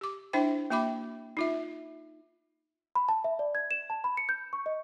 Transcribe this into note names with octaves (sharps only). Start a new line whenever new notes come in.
G4 D6
D4 E4 C5 E5 G5
A#3 F#4 E5 G5 B5 D6
D#4 F4 E5
B5
A5
E5
D5
G#6
E7
A5
B5
C#7
G6
C#6
D#5